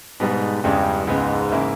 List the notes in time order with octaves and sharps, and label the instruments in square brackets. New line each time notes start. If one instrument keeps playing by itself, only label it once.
[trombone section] G#2 [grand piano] B2 G3 B3
[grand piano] E2 C#3 E3 G#3 [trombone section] G2
[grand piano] C#2 C#3 G#3 B3 [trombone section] G#2
[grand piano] C#3 E3 A#3 E4